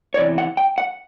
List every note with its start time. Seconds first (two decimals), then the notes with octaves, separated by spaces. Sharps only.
0.14 C#5
0.17 E2 C3 E3 D5
0.38 F#5
0.57 G5
0.78 F#5